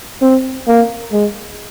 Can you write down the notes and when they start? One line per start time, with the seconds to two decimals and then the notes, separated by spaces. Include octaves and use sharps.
0.22 C4
0.68 A#3
1.12 G#3